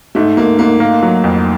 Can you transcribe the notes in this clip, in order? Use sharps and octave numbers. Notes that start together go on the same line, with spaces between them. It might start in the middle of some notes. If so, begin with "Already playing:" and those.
G#2 A3
G#2 A#3
G#2 A#3
A#3
F#3
F2